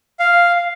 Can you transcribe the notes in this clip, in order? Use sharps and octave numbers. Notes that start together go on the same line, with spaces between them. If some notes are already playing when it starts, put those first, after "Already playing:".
F5